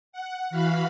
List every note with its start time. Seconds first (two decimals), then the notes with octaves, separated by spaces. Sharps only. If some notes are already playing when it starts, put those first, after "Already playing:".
0.12 F#5
0.50 E3 F#4 F5 B5